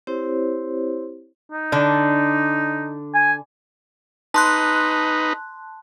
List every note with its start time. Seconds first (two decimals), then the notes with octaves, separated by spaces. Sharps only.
0.07 C4 E4 G4 C5 C#5
1.52 D#4
1.72 D3 D4
3.15 G#5
4.34 D#4 B4 A5 C6 F#6